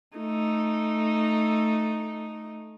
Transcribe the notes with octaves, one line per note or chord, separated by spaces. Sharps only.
A3 D#4